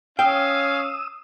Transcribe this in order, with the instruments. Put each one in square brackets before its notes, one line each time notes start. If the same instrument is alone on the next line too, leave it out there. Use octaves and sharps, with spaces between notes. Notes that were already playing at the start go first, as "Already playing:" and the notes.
[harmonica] C#4 [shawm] F5 [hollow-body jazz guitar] G5 [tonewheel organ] D#6 E6